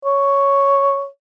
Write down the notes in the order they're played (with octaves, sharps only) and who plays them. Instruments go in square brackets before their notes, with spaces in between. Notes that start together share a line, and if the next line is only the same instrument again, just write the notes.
[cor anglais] C#5